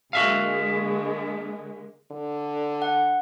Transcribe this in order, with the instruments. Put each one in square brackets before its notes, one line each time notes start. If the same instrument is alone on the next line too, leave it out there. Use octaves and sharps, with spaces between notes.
[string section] D3 G#3 A#3 [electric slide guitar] F#4 E5 F5
[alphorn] D3
[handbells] F#5